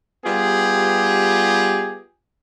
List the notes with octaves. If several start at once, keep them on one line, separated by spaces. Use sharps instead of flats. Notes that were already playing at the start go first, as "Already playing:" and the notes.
G3 B3 F4 G4 G#4